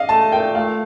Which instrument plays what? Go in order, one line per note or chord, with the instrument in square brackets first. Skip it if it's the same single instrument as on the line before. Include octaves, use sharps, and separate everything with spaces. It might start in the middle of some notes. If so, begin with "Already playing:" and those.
Already playing: [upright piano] D5 D#5 F5
[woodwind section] A3 [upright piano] A5
[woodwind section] A#2 [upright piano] G5
[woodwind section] A3 [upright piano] F5